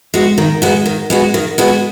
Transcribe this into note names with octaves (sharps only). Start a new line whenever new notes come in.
G#3 B3 F#4
D#3
G#3 B3 F#4
D#3
G#3 B3 F#4
D#3
G#3 B3 F#4